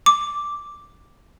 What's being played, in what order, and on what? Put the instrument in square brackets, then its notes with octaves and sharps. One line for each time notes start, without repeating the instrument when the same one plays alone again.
[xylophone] D6